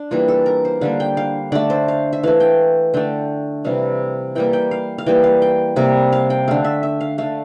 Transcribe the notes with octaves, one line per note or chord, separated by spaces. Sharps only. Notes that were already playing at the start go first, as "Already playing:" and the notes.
Already playing: D4
E3 G3 A#3 F4
A4
A#4
C5
D3 G3 A#3 F5
G5
F5
D3 A3 D5
C5
F5
E5
E3 A3 F5
G5
D3 A3 G5
C3 E3 G3 F5
E3 G3 A#3 G5
G5
F5
F5
E3 G3 A#3 G5
F5
G5
C3 G3 A#3
F5
G5
D3 A3 F5
E5
E5
F5
D3 A3 F5